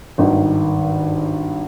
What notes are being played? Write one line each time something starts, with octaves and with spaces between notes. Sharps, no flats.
G#1 G2 D#3